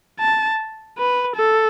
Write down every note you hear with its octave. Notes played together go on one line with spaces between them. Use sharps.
A5
B4
A4